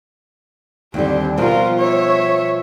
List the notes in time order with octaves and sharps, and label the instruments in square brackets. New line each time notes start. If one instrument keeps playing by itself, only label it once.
[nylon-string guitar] D#2 D3 G3 [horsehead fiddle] C4 G4
[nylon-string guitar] B2 F3 G3 [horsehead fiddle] F4 A#4
[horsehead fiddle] C#5 E5